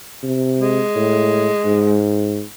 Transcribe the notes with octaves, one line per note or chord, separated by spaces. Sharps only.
C3
G#3
A2
G#2